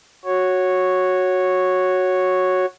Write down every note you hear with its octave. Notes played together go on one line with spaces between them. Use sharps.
F#4 C#5